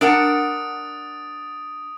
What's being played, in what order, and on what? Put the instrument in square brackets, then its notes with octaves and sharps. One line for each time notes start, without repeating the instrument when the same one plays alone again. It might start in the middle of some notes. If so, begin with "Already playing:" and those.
[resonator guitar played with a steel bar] D4 A#4 F#5 [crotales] D#6 A6 D7